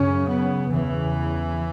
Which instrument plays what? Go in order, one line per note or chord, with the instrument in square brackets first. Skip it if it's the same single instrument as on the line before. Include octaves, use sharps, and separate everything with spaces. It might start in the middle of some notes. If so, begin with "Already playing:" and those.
Already playing: [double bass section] F#2 C#3 C#4
B3
E2 C#3 E3